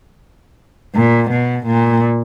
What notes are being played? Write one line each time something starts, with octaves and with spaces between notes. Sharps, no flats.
A#2
B2
A#2